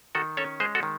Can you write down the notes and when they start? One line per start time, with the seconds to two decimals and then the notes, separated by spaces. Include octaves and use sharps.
0.15 D#3 F#4 A4
0.37 C#4 A4 C#5
0.60 G#3 G#4 C5
0.75 F#4 A4
0.83 D#3